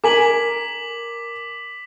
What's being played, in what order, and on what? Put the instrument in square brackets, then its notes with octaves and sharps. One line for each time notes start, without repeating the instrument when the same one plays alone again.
[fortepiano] A#4 G#5 [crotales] D6 B6 F#7